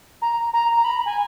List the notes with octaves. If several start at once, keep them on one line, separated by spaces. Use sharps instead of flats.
A#5
A#5
A#5
B5
G#5